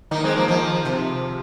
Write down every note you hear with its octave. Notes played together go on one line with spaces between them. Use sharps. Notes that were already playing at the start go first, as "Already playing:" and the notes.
D#3 A#3 D#4
G#3 C4
F3 A#3
D#3 F3
C3